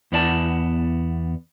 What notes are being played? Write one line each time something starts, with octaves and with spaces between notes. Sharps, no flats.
E2 B3 D5 A5